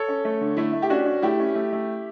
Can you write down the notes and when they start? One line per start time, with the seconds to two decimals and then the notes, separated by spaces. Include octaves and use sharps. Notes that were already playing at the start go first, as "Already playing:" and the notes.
Already playing: A4 C#5
0.08 C#4
0.25 A3
0.41 D3
0.57 A3 E4
0.73 A3
0.82 G4
0.90 C#4 D4 F#4
1.06 C#4
1.22 A3 E4 G4
1.40 C#4
1.55 A3
1.73 A3